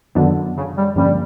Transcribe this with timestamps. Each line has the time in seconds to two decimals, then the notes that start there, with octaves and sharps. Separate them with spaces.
0.15 F#2 D3 D#3 F#3 B3 D4
0.56 C#3
0.76 G3
0.96 G2 D3 F3 G3 A#3 C#4